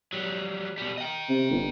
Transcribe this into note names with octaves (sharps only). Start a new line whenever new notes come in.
F#3 G3
B2 G3
D#5 G5
C3
G1